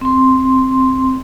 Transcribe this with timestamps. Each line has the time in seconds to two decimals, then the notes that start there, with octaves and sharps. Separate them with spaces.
0.01 C4 C6